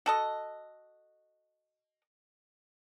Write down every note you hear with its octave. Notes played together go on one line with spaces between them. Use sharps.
F#4 A4 D#5